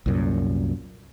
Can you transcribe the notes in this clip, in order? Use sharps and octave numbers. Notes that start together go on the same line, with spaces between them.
C2 F#2 A#2